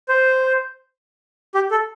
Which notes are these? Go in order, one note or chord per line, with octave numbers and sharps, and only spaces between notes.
C5
G4
A4